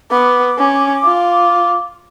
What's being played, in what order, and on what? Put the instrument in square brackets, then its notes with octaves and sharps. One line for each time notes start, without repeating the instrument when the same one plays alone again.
[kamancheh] B3 [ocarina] D6
[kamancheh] C#4
F4